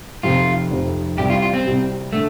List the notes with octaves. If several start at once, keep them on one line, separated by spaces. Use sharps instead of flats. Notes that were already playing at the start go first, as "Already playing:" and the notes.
F1 F2 C3 F4
F1 F2 C3
C2 C3 G3 G4
F4
F4
C4
C2 C3 G3
D3 A3